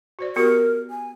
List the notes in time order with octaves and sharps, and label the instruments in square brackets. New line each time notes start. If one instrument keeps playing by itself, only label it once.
[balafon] F#4 C5 D5
[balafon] B3 F#4 G4 [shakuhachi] A#4
[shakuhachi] G#5